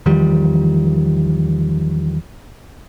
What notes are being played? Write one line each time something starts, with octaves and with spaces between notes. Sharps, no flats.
E2 D#3 F3 G3